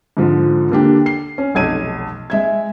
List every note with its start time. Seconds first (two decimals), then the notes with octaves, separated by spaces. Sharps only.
0.17 G#2 D3 F3
0.70 D3 A#3 D4 G4
1.06 C7
1.38 C#4
1.54 F1 B1 G#6 D#7
2.30 G#3 E5 G#6